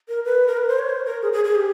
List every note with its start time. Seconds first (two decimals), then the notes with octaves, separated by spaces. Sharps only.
0.09 A#4
0.25 B4
0.47 A#4
0.57 B4
0.68 C5
0.79 C#5
0.90 C5
1.06 A#4
1.22 G#4
1.33 G#4
1.45 G#4
1.55 G4